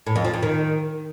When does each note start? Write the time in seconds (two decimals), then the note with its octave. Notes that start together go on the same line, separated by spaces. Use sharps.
0.07 A2
0.16 F2
0.25 F3
0.34 F2
0.43 D#3